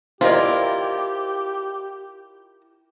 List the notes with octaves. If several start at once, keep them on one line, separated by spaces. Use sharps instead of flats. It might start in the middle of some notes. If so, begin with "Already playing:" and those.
E4 F4 G4 A#4 C5 D5 D#5